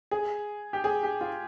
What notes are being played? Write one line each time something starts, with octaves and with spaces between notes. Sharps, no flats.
G#4
G4
G#4
G4
F4